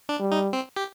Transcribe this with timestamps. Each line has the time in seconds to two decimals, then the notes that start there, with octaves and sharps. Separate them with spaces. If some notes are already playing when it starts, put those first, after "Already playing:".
0.09 D4
0.20 G3
0.32 D#4
0.53 C4
0.76 G4